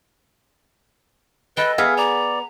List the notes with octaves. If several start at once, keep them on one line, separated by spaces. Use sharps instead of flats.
A4 B4 D#5 G5
B3 G#4 E5 F5
D5 A#5